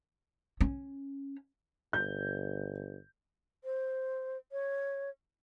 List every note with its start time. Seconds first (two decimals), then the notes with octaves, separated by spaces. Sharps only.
0.61 C#4
1.93 G1 G6
3.64 C5
4.52 C#5